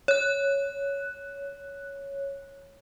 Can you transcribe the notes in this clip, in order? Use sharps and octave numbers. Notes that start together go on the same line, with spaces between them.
C#5 F#6